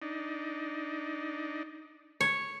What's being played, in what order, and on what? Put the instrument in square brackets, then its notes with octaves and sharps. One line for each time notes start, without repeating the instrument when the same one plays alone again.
[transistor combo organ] D4 D#4
[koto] C#5